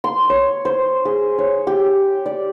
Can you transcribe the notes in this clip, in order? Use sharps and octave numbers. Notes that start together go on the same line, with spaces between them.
C6
C#5
C5
G#4
C#5
G4
D5